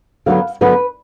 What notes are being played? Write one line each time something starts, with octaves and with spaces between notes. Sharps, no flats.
D3 F#3 B3 F5
D3 F#3 B3 B4